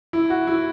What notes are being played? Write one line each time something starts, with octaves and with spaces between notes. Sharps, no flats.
E4
F#4
E4